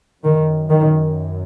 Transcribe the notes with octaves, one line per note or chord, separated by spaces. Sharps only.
F#2 D#3
D#3